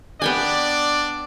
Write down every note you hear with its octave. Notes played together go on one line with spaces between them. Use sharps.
B3 D4 D5 G5 G#5